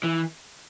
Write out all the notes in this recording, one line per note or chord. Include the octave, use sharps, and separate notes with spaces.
E3